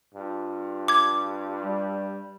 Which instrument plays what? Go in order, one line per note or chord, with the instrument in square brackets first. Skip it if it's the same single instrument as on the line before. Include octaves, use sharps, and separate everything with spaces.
[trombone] G2 [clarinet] F4
[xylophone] D6 G#6
[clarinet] G3